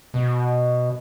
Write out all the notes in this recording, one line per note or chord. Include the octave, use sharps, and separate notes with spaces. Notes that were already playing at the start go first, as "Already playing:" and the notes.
B2